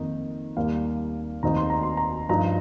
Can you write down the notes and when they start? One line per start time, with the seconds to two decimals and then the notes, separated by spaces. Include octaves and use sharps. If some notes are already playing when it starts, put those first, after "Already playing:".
Already playing: F2 D#3 A#3 D#4
0.57 D#2 D#3 G3 A#3 F5
1.43 F1 D#2 D#3 C4 D#4 A#5
1.56 C6
1.70 A#5
1.83 C6
1.97 A#5
2.29 G2 F3 D#4 A#5